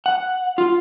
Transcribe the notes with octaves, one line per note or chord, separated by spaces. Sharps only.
F#5
F4